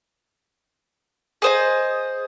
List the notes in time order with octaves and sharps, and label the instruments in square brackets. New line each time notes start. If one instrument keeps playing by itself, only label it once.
[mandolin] G#4 C5 D#5